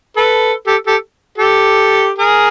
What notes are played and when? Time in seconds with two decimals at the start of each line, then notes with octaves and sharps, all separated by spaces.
0.16 A4 B4
0.67 G4 A4
0.87 G4 A4
1.38 G4 A4
2.18 G#4 A#4